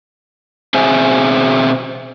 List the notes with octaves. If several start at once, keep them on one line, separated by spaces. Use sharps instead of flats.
B2 C4 G#4 C5 E5 G#5